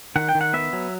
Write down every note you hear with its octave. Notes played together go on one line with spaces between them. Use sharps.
D#3 F#5
G5
D#3
F#5
B3 E5
F#3